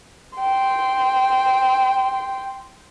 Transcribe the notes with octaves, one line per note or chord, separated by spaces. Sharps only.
G5 C6